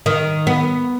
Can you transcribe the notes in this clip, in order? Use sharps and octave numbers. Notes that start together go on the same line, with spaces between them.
D#3
B3